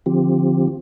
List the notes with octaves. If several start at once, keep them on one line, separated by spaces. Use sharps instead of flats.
D3 F3 C4 F4 G4